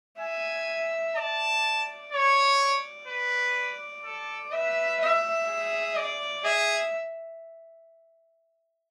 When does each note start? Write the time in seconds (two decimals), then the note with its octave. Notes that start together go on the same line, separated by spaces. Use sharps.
0.19 E5 G#5
1.16 D5 A5
2.12 C#5
2.59 D5
3.07 B4
4.04 A4
4.51 B4 E5
5.00 E5
5.48 G#4
5.96 D5
6.44 G#4 E5